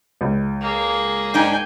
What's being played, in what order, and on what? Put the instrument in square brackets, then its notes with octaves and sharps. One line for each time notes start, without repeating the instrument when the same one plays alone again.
[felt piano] C#2
[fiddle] A#3 G#4
[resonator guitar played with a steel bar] G#2 D4 D#4 [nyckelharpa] G5 G#5